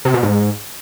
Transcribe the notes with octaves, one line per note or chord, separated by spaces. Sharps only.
C3
B2
G#2